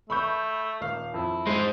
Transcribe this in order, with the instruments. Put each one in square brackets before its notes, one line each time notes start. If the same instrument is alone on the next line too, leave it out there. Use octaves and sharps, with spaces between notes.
[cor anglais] A3 [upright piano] B5 C#6 G6
[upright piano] D#1 F5
[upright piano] F2 [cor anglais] E4
[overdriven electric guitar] G#3 D#4 [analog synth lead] C5